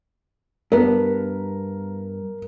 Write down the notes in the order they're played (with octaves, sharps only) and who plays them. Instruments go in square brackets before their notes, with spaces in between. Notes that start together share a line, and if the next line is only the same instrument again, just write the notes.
[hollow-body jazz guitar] G2 B3 [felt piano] A#4